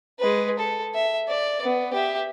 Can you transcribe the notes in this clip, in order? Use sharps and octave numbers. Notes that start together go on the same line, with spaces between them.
G#3 B4
A4
E5
D5
B3
G4 E5